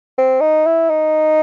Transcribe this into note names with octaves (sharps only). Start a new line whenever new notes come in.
C4
D#4
E4
D#4